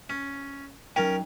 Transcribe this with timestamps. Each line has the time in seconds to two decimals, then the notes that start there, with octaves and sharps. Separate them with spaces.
0.10 C#4
0.96 F#3 C#4 D#4 A#4 G5